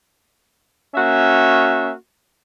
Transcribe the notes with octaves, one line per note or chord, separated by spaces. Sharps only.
A#3 C#4 F#4 E5